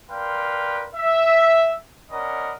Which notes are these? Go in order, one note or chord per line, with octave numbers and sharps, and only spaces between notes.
A#4 B4 D5 F5 G5 C6
E5
C#4 A#4 D5 D#5 F#5 B5